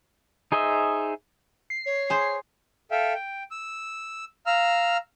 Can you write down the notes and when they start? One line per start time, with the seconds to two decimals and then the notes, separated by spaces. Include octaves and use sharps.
0.52 D#4 G#4 C5 D#5 E5
1.70 C7
1.86 C#5
2.10 G#4 C5
2.91 A4 E5 F5 G5
3.14 G5
3.51 E6
4.46 F5 A#5 E6 F6